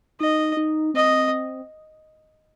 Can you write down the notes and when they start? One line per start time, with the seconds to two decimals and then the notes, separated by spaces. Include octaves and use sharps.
0.20 D#4 D#5
0.57 D#4
0.94 C4 D#5